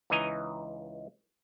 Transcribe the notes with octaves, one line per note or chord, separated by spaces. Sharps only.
C#2 E3 D#4 D#5 G#5 A#5